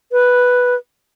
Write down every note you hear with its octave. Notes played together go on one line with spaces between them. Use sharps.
B4